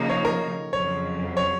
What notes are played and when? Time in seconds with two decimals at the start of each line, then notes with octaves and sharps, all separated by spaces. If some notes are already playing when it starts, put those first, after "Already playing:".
Already playing: C#3 F3 A#3 D#4
0.09 C#5
0.25 A#4
0.73 F2 C#3 F#3 C#5
1.37 C#5